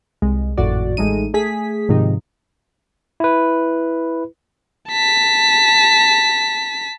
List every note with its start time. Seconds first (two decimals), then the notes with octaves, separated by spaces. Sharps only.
0.22 C2 G#3
0.57 G#1 F2 A2 F#4 D5
0.97 A1 G#3 A3 D#4 D#7
1.34 A3 G#4 B6
1.89 G#2 C3 D#3 F3 D#4
3.20 E4 B4
4.89 A5 B6